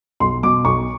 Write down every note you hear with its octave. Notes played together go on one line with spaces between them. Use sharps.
B1 C6
B2 D6
B1 C#6